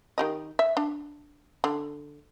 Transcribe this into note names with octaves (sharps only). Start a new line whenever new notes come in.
D#3 G4 D#5
E5
D4
D3